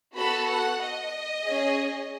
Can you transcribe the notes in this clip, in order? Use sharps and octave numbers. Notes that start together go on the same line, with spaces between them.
B3 F#4 A4 B5
F#5
D#5
C#4 G#4